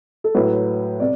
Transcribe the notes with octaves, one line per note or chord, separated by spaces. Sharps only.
A4
A2 F#3 B4
C3 D5